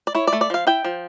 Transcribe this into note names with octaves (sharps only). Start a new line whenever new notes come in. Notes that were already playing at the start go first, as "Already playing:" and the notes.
D5
E4 C#5
D5
A3
D5
F3 F5
E4 G5
F3